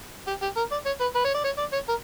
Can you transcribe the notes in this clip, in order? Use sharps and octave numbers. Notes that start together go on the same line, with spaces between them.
G4
G4
A#4
D5
C#5
B4
B4
C#5
D5
C#5
D5
C#5
A#4